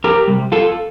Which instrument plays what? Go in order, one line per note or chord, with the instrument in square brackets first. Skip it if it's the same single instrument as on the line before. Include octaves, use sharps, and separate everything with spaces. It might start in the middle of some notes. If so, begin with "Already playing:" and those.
[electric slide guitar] F2 G4 A#4
C3 G3
F2 F4 A4